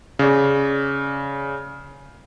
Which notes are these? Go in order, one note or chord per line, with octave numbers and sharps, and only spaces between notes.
C#3 D5